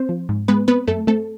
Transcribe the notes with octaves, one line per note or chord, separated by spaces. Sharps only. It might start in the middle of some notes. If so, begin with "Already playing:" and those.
Already playing: C4 C5
F3
G#2
G#3 B3 B4
B3 C4 B4
F#2 A3 A4
A3 C4 A4